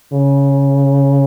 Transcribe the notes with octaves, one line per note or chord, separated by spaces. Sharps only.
C#3